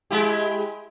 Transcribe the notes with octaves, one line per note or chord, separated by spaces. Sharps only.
G#3 E4 G4